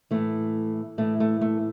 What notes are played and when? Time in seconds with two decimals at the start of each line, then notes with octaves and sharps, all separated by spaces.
0.11 A2 E3 A3
0.98 A2 E3 A3
1.20 A3
1.41 A3